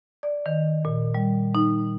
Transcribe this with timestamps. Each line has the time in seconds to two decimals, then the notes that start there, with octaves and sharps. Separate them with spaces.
0.23 D5
0.46 D#3
0.85 A#2
1.14 G3
1.55 D#4